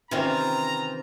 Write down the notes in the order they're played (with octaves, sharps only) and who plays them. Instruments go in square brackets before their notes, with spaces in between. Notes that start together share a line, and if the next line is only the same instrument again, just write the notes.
[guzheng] C3 D#3 C#4 [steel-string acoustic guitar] E3 C4 F4 [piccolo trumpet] A#5